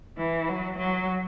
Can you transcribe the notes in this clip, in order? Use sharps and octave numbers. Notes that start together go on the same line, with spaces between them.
E3
F#3
F#3